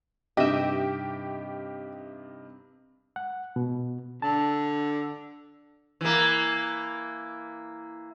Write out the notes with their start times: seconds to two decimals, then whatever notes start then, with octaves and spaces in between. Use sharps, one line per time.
0.37 G2 C3 D#4 G4 D#5 E5
3.16 F#5
3.56 B2
4.22 D3 A5
6.01 E3 A#3